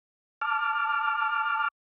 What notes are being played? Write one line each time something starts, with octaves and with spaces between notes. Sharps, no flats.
A5 D6 F6